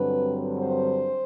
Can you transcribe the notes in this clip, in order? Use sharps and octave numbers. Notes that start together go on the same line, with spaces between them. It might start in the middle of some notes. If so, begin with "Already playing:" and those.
Already playing: G2 D3 F#3 C4 B4
C5